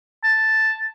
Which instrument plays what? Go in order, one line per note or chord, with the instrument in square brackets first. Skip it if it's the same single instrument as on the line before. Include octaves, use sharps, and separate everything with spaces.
[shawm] A5